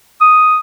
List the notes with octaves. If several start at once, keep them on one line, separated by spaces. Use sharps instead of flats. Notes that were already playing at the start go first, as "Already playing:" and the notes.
D#6